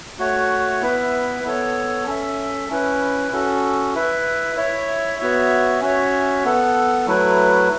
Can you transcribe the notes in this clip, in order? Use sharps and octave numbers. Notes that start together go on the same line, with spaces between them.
A3 F#4 C#5 F#5
B3 E4 B4 E5
B3 A4 C#5
C#4 A4 E5
C#4 E4 B4
C#4 F#4 A4
E4 B4 E5
E4 C#5 E5
B3 F#4 C#5 E5
C#4 F#4 C#5 E5
B3 A4 F#5
F#3 A3 E4 B4